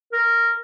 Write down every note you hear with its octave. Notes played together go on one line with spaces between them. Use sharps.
A#4